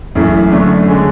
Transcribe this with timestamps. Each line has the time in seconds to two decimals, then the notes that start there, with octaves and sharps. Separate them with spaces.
0.15 F#2 E3 A3 E4
0.51 F#2 D3 A3 D4
0.87 D3 G#3 C#4